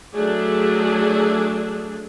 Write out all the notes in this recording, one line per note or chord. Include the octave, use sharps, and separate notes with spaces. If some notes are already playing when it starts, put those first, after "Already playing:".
F#3 A3 D4 G#4